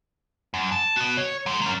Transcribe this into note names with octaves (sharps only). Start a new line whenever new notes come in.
F#2
A5
B3 F#4
C#5
F#3 G#3
F#3 C#4